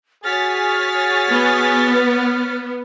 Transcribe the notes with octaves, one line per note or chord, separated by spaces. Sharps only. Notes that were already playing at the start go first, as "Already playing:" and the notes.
F#4 G#4 C#5 F6 A6 B6
B3